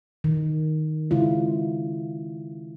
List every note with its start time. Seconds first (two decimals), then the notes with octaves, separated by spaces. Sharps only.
0.24 D#3
1.11 C#3 G#3 E4 F4